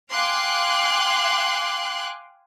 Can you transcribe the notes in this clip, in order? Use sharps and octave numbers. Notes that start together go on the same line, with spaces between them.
F5 G5 G#5 C6 D6 F#6